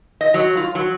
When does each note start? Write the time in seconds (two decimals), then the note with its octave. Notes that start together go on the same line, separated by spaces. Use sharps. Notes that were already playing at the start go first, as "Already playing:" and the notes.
0.21 D#5
0.34 F#3
0.57 F4
0.75 F#3